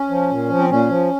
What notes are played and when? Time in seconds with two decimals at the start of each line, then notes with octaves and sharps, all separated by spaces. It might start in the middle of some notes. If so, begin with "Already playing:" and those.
Already playing: C#4
0.10 F3
0.30 A#2
0.50 F3
0.58 C4
0.69 A#2 C#4
0.89 F3